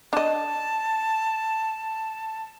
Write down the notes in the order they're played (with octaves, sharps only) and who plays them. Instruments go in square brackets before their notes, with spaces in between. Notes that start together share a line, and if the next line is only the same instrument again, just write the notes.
[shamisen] D4 D#5 [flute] A5